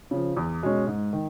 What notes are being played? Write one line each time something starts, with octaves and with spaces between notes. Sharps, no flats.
C#3 F3
E2
B2 G#3 C#4
G#2
D#3